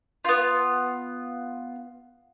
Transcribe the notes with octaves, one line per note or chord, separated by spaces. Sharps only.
B3 F4